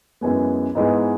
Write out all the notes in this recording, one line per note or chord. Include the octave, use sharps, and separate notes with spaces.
F#2 E3 G#3 B3 G#5
G#2 E3 G#3 B3